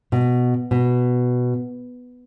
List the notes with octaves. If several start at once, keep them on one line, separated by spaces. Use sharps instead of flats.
B2
B2